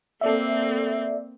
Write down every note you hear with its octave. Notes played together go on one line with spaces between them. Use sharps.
A#3 C4 A4 D5 E5